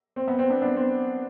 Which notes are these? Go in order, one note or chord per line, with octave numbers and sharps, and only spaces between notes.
C4
B3
C4
B3 D4
B3 D4
C4